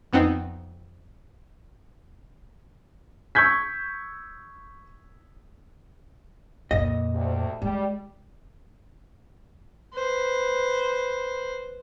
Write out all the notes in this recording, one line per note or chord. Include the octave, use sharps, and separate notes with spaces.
F2 B3 C4 D#4
C#6 E6 G6 G#6 B6
F2 A#2 D#5
D2 C3 A3
G3 G#3
B4 C5